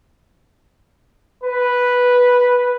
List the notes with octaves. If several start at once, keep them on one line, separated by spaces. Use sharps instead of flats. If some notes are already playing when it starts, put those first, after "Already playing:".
B4